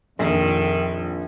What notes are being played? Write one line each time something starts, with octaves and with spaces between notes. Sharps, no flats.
A#1 F2 D#3